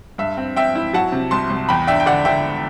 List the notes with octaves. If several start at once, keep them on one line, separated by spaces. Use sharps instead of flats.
G2 E5
C4
C4 E5 G5
E4
F#3 F#5 A5
C3
C2 A5 C6
C2
E2 G5 B5
D4 E5 G5
G5
D3 D5 F#5
D3 E5 G5